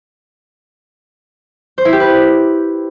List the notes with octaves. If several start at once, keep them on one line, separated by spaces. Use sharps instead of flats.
C5
E4
G4
B4